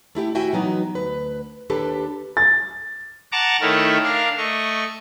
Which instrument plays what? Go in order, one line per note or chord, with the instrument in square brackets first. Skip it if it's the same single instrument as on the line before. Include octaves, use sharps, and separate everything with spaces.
[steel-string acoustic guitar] A3 E4 G4 G5
D#2 E4 F#4 E5 G5 G#5
E3 F#3 B3 D#4
D2 B4
D#2 D4 G4 A4 B4
[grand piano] A6
[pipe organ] F#5 A5 A#5 C#6 D6
D#3 A3 E4 A4 A#4 C#5
D4 A#4 F5
A3 D#5 C#6